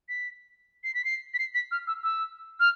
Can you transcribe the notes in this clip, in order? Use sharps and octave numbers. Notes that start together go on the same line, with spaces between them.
B6
C7
B6
C7
B6
C7
B6
F6
E6
E6
F6